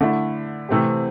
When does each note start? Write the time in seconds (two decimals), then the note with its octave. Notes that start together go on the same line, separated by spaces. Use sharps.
0.01 D3 A3 E4
0.69 C3 E3 A3 C4 G4